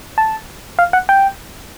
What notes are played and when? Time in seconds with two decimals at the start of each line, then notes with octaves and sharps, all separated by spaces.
0.18 A5
0.79 F5
0.93 F#5
1.09 G5